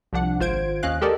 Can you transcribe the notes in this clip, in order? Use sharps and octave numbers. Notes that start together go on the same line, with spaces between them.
C2 F3 D4 F#5
G#1 F4 C5 G#6 D7
D#2 C#4 D#5 F5 F#6
G#3 G4 A4 A#4 D5 D#5